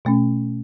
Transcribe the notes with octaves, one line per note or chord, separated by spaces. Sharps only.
B2 A3 C#4